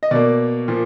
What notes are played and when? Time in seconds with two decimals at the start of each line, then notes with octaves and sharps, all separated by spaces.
0.03 D#5
0.11 B2 A#3 D5
0.68 A#2 F3